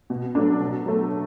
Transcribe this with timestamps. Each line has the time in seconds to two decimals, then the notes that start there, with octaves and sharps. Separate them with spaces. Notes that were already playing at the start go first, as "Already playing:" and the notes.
0.10 B2
0.35 F#3 A3 D4
0.60 B2
0.86 F#3 A3